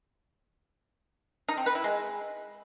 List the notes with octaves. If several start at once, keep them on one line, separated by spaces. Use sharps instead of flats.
D#4
C4
B4
E4
G#3